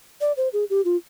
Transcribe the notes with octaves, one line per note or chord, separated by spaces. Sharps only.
D5
C5
G#4
G4
F4